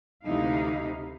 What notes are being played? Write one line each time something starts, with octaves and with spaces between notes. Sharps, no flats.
D2 C3 E3 D#4 E4 F5